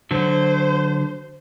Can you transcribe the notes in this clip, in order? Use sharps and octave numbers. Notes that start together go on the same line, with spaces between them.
D3 F#3 C5